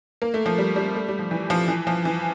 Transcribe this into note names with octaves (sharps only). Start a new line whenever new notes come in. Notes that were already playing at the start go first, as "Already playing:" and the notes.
A#3
A3
F3
G3
G3
A3
G3
F3
E3
F3
E3
F3
E3